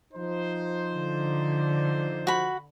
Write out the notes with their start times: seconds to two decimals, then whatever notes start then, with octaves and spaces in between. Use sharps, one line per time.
0.13 F3 D#4 C5
0.94 D3
2.27 F#4 B5